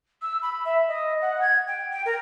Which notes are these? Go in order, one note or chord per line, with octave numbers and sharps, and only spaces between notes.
E6
B5
E5
D#5
F#5
G#6
G5
G5
A#4